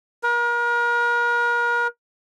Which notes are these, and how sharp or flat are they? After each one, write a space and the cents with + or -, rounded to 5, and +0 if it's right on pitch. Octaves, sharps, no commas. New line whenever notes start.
A#4 +35